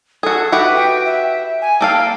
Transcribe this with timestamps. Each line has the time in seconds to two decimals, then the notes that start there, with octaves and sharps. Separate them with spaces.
0.23 F#4 G#4 A4
0.52 F#4 G4 B4 E5
0.75 G5
1.05 E5
1.62 G#5
1.81 A#3 A4 F5 G5